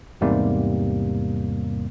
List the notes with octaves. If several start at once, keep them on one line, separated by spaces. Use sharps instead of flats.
E2 G#2 C3 G3 A#3